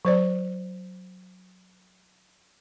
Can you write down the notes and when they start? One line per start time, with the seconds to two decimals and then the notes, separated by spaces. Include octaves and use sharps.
0.05 F#3 C5 D5